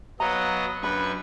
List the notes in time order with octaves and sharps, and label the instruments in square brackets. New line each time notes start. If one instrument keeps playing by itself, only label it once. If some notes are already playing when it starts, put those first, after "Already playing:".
[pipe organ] F#3 B3 D#5 [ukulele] C#5 F5 A#5
[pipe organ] F#2 B4 C#6 [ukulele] D4 B5